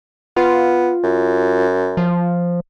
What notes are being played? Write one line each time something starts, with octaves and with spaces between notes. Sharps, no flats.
B3 F4
F#2
F3